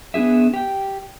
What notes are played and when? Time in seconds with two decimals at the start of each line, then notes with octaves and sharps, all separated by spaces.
0.14 B3 D4 E4 G#4 E5
0.54 G4 G5